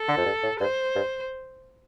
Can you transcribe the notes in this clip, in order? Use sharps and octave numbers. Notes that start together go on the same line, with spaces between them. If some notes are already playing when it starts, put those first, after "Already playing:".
Already playing: A4
D3
F2
G2
A2
G2 C5
G2